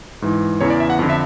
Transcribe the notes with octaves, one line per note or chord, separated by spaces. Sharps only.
G#2 E3
E2 C#3 E3 C#5
D5
E5
F#5
F2 D3
E5